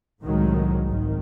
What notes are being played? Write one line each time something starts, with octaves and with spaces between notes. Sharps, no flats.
C2 A2 D#3 F#3 G#3
G#1 D#3